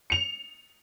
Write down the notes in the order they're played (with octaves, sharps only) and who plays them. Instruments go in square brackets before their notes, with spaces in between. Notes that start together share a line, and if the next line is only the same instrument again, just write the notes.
[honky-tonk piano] C#7 F7